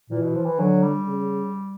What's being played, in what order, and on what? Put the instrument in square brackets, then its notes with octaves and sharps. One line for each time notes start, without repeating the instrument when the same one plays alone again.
[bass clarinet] A#2 [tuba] E3
[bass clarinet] B2
F3
E3
[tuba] D3 [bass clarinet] F#3
[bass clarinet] G3
[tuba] C#3